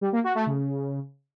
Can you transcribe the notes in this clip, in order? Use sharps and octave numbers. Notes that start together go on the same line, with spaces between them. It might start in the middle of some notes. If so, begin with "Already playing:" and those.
G3
A#3
F#4
A3
C#3